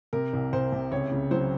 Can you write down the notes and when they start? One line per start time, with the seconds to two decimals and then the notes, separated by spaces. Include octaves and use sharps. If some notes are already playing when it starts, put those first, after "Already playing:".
0.13 C3 A#4
0.33 C2
0.53 C2 C5
0.72 C3
0.92 C#2 C#5
1.12 C#3
1.31 F#3 C5